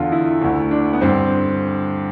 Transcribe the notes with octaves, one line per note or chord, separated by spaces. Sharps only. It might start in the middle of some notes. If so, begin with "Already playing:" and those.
Already playing: E2 D3 F4
E4
D2 D3
D4
B3
G2 D3 C4